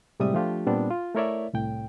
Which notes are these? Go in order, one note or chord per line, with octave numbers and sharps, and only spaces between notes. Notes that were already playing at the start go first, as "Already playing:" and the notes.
A2 C3 G3 G#3 E5 D#6
F3 A3 D4 F4 G4
A#2 G3 B3 C4 D4
F4
A3 E4 A#4 C#5 D5 E5
C2 A2 G5